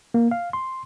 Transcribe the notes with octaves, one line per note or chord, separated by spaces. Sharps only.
A#3
F5
C6